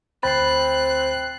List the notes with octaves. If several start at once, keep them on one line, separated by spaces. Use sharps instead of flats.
D2 C4 B5 F#6 A6 C7